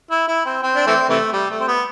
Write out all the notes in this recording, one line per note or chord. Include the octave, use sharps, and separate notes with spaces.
E4
E4
C4
C4
D4
E3 A3 C4
C3 E3 A3
G3
A3
C4
B3